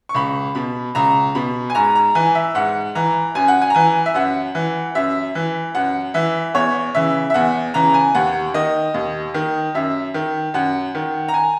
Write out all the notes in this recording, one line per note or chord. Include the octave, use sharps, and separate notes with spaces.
C#6
C#2 B5
B2 B5
C#2 A#5
B2 B5
G#5
G#2 A#5
A#5
E3 G#5
E5
G#2 F#5
E3 A#5
F#2 G#5
F#5
G#5
A#5
E3 G#5
E5
F#2 F#5
E3
F#2 E5
E3
F#2 F#5
E3 E5
E2 C#5
C#3 E3 E5
E5
E2 F#5
C#3 E3 A#5
G#5
D#2 F#5
D#3 D#5
D#2
D#3
F#2 E5
D#3
F#2 F#5
D#3
A#5
G#5